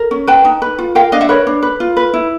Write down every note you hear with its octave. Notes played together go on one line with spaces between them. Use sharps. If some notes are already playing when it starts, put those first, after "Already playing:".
Already playing: A#4
C#4
B4 G5 A5
D#4
B4
F4
A#4 F5 G5
D4 D#5 F5
E5 F#5
A#4 B4 C#5
D4
B4
F4
B4
E4